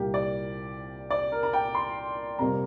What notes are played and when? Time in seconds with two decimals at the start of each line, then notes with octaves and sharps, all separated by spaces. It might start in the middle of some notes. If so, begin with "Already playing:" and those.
Already playing: C2 A#2 G3 A#3 G4
0.14 D5
1.10 D5
1.32 A#4
1.43 A#5
1.53 G5
1.75 C6
2.39 F2 C3 G3 A#3 A#5